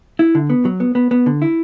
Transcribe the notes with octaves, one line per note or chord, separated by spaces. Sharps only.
E4
D3
B3
F#3
B3
B3
B3
D3
E4